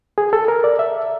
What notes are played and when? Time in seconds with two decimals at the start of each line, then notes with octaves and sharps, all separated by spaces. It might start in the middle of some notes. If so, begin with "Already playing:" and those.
0.18 G#4
0.33 A4
0.48 A#4
0.64 D5
0.79 E5